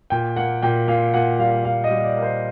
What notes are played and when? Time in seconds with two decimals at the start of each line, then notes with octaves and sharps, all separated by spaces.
0.10 A#2 G5
0.36 A#3 F#5
0.63 A#2 G5
0.88 A#2 F5
1.14 A#2 F#5
1.39 G3 F5
1.65 A#2 F5
1.84 D#5
1.91 G3
2.04 D5
2.17 A#3
2.22 C5